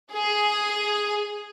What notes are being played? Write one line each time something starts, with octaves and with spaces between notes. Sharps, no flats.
G#4